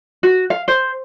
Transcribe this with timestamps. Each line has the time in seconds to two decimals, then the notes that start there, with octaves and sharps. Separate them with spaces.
0.23 F#4
0.50 F5
0.68 C5